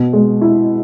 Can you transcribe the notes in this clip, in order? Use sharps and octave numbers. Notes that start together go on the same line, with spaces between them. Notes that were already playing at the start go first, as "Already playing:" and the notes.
Already playing: B2
G#3
E4